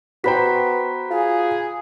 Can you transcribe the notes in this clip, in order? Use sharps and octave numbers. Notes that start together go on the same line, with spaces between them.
B3 F#4 C5 G5 A#5 B5 B6
F4 G#4